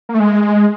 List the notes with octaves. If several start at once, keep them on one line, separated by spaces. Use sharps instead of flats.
A#3
A3
G#3